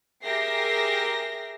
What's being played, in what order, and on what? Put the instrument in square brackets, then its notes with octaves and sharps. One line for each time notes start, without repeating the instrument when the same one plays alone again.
[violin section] G4 G#4 A#4 E5 A#6 C7